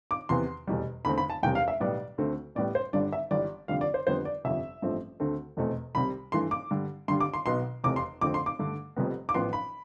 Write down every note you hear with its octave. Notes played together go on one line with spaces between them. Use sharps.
D6
E2 C3 E3 B3 C6
F1 E2 B2 G3
E2 D3 A3 C4 B5
B5
A5
E1 E2 C3 G3 G5
F5
E5
B1 A2 G3 B3 D5
D2 D3 A3 C4
A1 A2 G3 B3 D5
C5
G1 G2 D3 G3 D5
E5
G1 G2 E3 G3 D5
F1 F2 D3 G3 F5
D5
C5
F2 D3 G3 B3 C5
D5
G1 F2 C3 E5
A1 G2 F3 A3 C4
D2 D3 A3 C4
F1 E2 B2 A3 C4
C2 C3 G3 B5
G2 E3 A3 C6
D6
G2 D3 G3
G2 D3 G3 C6
D6
C6
B1 B2 B3 C6
F1 E2 C3 D6
C6
F2 D3 A3 C4 D6
C6
D6
G2 D3 A3
F1 F2 C3 G3 B3
D6
A1 A2 F3 B3 C6
B5